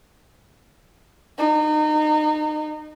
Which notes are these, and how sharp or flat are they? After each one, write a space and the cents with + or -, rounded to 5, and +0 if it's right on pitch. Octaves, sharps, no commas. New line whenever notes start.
D#4 -30